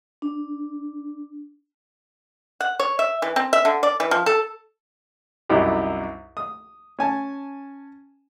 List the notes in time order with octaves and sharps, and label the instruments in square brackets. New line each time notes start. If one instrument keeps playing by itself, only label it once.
[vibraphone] D4
[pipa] F#5
C#5
E5
E3
C4
E5
D3
D5
E3
F3
A4
[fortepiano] C2 F#2 D#4 E4 G4
D#6
C#4 G#5 A5